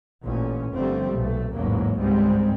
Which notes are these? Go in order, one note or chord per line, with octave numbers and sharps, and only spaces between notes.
A1 A#2 D3 C#4
G1 F2 D3 G3 A3 C4
B1 A#2 A3
A1 E2 G#2 C#3 F#3 A#3
G1 C#2 G#2 G3 G#3 C4